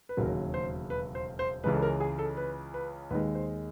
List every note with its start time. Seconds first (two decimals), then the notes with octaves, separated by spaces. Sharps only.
0.09 B4
0.17 E1 D#2 C#3 F#3 A#4
0.54 C5
0.90 B4
1.15 C5
1.39 C5
1.64 C#2 C#3 E3 G#3 B4
1.74 A4
1.82 A#4
2.00 G#4
2.19 A4
2.37 B4
2.74 B4
3.10 D#2 D#3 G#3 B4
3.35 C5